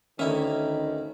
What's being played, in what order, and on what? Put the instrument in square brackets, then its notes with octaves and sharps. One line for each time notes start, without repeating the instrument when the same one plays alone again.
[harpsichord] D2 E4 E5 [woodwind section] D#3 [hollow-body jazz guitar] C#4